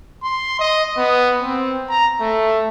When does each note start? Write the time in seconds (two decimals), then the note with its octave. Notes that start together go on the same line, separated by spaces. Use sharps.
0.23 C6
0.59 D#5
0.97 B3
1.42 C4
1.88 A#5
2.21 A3